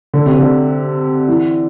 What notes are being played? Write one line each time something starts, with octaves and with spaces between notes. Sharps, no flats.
D3
C3
D3
E3